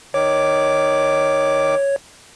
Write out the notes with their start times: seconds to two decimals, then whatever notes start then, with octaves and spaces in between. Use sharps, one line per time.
0.14 D#3 C#5 D6